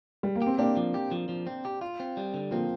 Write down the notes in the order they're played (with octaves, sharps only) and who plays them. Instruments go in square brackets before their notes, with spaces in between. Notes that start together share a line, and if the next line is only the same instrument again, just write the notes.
[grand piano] G3
A#3
[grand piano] C4 [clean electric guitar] G4
[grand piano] A#3 D4 [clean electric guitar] G4
[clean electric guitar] F3
G4
F3
F3
C4
G4
F4
C4
G3
D3
[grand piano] F3 A#3 [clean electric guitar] C4